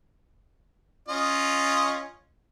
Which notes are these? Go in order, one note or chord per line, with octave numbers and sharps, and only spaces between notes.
C#4 F4 D#5